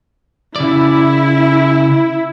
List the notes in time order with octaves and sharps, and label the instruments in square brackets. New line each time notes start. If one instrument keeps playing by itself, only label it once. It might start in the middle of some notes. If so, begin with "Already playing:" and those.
[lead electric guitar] C#3 D5 [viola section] E4